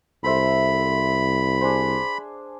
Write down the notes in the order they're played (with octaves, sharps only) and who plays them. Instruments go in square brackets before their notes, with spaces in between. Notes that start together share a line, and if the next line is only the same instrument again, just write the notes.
[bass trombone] C2 [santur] A4 C5 E5 [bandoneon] B5
[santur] D4 G#4 C5